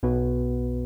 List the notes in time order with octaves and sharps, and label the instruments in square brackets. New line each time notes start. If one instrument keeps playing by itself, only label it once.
[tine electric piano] B1 B2 B3 F#4 B4